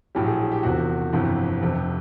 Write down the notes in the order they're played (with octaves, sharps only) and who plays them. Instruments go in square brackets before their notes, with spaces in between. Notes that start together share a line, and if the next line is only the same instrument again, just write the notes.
[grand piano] A#1 A2 F#3 G4
G#4
G4
G4
E1 E2 C3 F3 F#4
G1 F2 C3 E3
F1 F2 C3